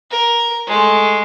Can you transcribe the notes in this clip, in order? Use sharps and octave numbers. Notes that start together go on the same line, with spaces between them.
A#4
G#3 A3